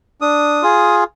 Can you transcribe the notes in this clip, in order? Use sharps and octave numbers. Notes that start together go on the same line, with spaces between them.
D4 D#6
F4 G#4